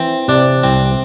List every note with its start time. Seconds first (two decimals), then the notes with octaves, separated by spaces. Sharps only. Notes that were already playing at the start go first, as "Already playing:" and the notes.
Already playing: E3 C4
0.28 C3 D4
0.63 C2 C4